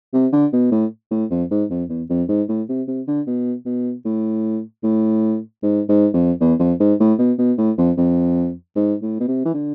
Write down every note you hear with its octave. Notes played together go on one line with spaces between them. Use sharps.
C3
D3
B2
A2
A2
F2
G#2
F2
E2
F2
G#2
A2
C3
C3
D3
B2
B2
A2
A2
G#2
G#2
F2
E2
F2
G#2
A2
B2
B2
A2
F2
F2
G#2
A2
B2
C3
E3
D3